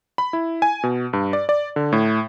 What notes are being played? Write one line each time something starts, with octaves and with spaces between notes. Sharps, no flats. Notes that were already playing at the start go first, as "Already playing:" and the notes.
B5
E4
G#5
B2
G2
D5
D5
D3
A2